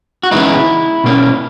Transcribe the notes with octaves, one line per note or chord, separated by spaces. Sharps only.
F#4
C#3 E3 G#3 B3 D#4 E4
B2 A#3 C#4